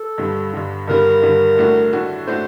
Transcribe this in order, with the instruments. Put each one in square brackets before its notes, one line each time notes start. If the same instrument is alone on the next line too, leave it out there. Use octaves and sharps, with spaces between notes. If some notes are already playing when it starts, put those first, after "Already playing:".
Already playing: [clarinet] A4
[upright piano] G2 D3 G3
G2 D3 G3
[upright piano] G2 D3 G3 [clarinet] A#4
[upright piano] G2 D3 G3
A2 A3 D4 F#4
A2 A3 D4 F#4
[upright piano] A2 A3 D4 F#4 [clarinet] C5